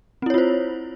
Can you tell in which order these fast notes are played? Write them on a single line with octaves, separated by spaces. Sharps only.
C4 E4 C#5 F4 C5